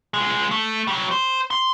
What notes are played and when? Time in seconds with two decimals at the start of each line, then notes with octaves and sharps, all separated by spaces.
0.14 C#2 G#3
0.51 A3
0.87 F#3 G3
1.11 C5
1.51 C6